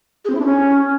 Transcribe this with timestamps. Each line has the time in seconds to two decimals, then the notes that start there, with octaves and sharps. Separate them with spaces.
0.25 G#4
0.30 C4
0.35 E4
0.40 D4
0.45 C#4